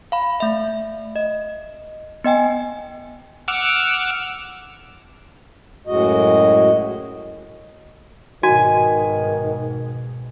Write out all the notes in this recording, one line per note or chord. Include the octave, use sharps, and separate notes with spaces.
F5 B5
A3 E5
D#5
B3 D#5 G5 G#5
F#5 D6 E6 F6
F#2 A2 G#3 F#4 D#5
G#2 B2 D#3 F#4 G#5